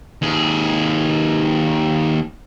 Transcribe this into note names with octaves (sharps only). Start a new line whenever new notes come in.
D#2 G#4